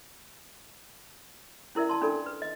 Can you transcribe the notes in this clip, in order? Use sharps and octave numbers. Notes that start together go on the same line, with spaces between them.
C#4 E4 A#4 D5 E5
A5 C6
C#4 D4 F4 A4 D5
B4
D#5